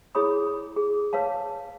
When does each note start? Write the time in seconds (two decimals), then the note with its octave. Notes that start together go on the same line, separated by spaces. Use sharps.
0.15 E4 G#4 C#5 B5 D#6
0.76 G#4
1.13 B4 C#5 F5 A5